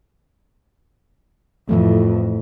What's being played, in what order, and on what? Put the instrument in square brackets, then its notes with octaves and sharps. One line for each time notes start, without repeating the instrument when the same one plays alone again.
[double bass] F2 A2 [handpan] E3 F3 A3